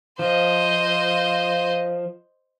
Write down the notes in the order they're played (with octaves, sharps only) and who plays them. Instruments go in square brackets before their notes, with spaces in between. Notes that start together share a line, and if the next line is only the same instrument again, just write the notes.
[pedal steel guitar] F3 [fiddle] C5 D#5